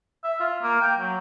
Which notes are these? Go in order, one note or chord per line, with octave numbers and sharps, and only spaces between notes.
E5
F4
A#3
G5
F#3